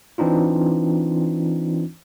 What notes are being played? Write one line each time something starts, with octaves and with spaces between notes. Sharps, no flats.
E3 C4 D4 D#4 F4